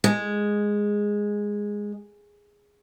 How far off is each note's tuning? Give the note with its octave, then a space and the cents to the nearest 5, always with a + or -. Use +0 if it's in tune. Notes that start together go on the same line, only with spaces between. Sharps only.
G#3 -5